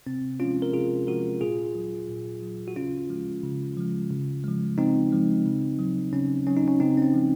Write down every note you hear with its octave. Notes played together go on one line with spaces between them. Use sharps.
C3 C4
F3 G#3 C#4 F4
A#4
C3 F4 G#4
F3 G#3 F#4 A#4
A#2 F4 G#4
F#3
A#2
F#3
F#4
C#3 C#4 F4
F3 G#3
C#3
F3 G#3
C#3
F3 G#3
C#3 C4 D#4
F3 G#3
C#3
F#3
C#3 C#4
F#3 C#4
D#4
C#4
C#3 C4 D#4
C#4
C4
F3 G#3